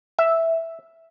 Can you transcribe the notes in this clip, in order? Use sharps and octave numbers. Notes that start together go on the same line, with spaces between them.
E5